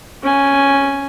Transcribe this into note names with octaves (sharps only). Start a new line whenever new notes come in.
C#4 G#5